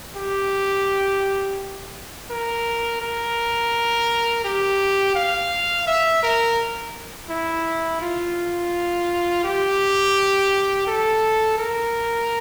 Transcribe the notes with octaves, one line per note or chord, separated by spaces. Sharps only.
G4
A#4
A#4
G4
F5
E5
A#4
E4
F4
G4
A4
A#4